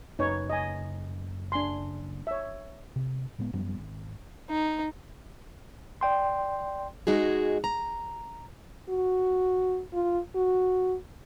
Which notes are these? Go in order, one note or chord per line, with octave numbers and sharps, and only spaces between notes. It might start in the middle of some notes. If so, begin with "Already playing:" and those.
F#1 D#4 B4 C#5
D#5 G#5
D4 G#5 C6
C#5 E5
C3
A2 G#3 B3
F#2 F3 G3 B3
G#1
D#4
D5 G5 C6
G#3 D#4 F#4 G#4
A#5
F#4
F4
F#4